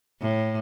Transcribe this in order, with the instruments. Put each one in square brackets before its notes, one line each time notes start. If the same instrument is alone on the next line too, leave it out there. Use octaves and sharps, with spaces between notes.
[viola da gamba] A2